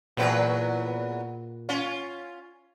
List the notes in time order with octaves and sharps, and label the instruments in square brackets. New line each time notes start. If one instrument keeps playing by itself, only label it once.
[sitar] E2 F#3 B4 [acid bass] A#2
[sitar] C#4 F4